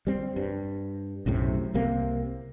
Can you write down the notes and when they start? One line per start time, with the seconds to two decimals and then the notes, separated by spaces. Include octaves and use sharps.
0.07 G3 C4
0.36 G2
1.26 B1 F#2 A2 C3
1.74 C2 C3 A#3 C4